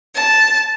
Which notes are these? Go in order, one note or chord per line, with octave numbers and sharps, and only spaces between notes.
A5